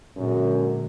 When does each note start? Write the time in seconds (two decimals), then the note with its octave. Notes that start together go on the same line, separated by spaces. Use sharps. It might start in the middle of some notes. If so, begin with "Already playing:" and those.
0.17 F#2 A#2 D3 G#3